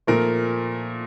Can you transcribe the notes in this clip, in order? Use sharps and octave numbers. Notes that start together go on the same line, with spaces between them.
A#2 F3 A3 A#4